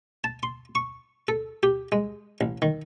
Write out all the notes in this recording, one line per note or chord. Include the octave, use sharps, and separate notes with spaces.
A5
C6
C#6
A4
G4
G#3
A1
D#3